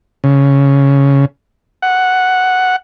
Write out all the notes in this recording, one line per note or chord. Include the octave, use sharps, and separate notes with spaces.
C#3
F#5